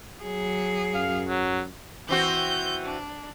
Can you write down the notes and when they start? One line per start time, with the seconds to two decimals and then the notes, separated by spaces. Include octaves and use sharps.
0.23 F#3 G#4
0.94 F#2 F5
1.28 F#3
2.09 E3 C4 F#4 G6
2.85 D4